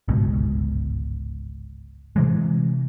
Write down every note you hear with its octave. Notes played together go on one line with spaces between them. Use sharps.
G1 C#2 G#2 B2
C3 E3 G#3